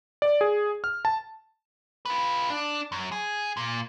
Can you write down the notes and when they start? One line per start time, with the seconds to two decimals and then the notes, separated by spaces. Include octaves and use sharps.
0.22 D5
0.41 G#4
0.84 F6
1.05 A5
2.06 F4 B4
2.50 D4
2.92 F#2
3.12 G#4
3.57 A#2